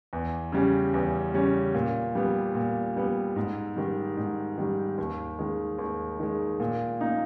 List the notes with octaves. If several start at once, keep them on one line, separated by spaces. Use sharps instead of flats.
E2
C#3 G3 C#4
E2
C#3 G3 C#4
A#2
G3 B3
A#2
G3 B3
G#2
D#3 G3
G#2
D#3 G3
D#2
D#3 G#3
D#2
D#3 G#3
A#2
A#3 D#4